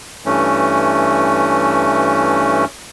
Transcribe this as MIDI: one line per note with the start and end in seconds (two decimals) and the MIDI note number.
0.25 2.65 43
0.25 2.65 52
0.25 2.65 57
0.25 2.65 61